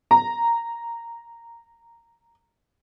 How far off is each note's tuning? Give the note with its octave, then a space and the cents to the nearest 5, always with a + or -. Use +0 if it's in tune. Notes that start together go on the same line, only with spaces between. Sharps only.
A#5 -5